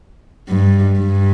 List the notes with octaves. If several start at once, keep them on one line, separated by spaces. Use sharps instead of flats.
G2
G2